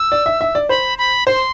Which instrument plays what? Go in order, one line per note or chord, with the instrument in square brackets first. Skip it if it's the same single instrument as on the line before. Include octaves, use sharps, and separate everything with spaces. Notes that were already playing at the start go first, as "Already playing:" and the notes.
Already playing: [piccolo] E6
[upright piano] D5
E5
E5
D5
[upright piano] C5 [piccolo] B5
[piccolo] B5
[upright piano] C5 [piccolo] C6